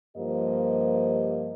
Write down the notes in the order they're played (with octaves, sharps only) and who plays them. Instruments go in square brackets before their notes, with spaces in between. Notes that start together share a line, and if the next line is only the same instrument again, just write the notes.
[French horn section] G2 F3 A#3 G4 C5 D#5